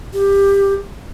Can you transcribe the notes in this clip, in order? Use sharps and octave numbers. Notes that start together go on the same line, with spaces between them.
G4